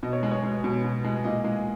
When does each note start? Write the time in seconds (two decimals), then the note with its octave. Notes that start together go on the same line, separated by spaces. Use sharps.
0.03 B2 D#5
0.13 C#5
0.23 G#3
0.31 C#5
0.44 G#3
0.64 B2
0.84 B2
1.04 G#3
1.24 A#2 D#5
1.44 G#3